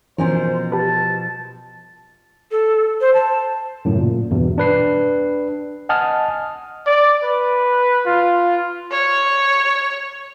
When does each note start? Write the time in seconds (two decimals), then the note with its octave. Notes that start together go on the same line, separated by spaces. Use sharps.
0.18 B2 E3 F3 C#4 A#4 C5 G#5
0.72 G4 B4 A5
2.51 A4
3.01 C5
3.14 A5
3.85 F#2 A2 C#3
3.98 A#2
4.31 E2 G2 B2
4.58 D4 B4 C7
5.89 D#5 F#5 G#5 A5 D#6 F6
6.87 D5
7.24 B4
8.06 F4
8.91 C#5